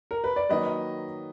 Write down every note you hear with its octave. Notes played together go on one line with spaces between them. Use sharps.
A#4
B4
D5
D#3 F#3 A#3 B4 D#5